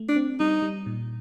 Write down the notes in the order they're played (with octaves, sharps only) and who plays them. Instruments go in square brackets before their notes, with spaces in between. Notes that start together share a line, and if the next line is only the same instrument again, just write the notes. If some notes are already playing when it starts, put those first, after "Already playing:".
Already playing: [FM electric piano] A3
[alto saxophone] D4
[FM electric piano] C4
[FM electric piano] G3 [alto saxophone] D#4
[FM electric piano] G3
A#2